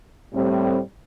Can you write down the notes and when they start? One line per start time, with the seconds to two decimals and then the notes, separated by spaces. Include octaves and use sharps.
0.33 A2 G3 C4